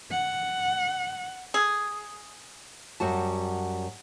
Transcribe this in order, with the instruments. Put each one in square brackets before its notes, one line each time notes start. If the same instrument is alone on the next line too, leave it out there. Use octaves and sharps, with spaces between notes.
[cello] F#5
[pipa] G#4
[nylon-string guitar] F#2 G3 F#4 A5